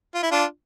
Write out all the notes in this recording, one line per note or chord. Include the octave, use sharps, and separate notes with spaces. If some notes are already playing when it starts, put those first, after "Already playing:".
F4
E4
D4 F4